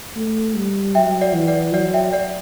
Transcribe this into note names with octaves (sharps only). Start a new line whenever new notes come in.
A3
G3
F#3 E5 G5
D5 F#5
E3
D5 F#5
F#3 D5 F#5
E5 G5
D5 F#5